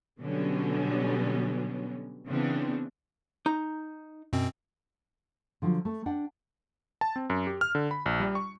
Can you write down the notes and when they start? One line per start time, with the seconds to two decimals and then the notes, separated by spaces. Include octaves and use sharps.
0.21 B2 D3 F#3 G3 B3 C#4
2.29 C#3 E3 B3 C4 D4
3.46 D#4 A#5
4.33 F#2 B2 C4
5.62 D3 F3 F#3 F4
5.85 A3
6.06 D4 D5 F#5 G5
7.01 A5
7.16 C4
7.30 F#2
7.47 G4
7.61 F6
7.75 D3
7.91 B5
8.06 A#1
8.20 G3
8.35 C#6